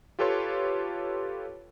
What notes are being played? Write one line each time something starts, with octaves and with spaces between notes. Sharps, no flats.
F4 G4 A4 B4 C#5 C6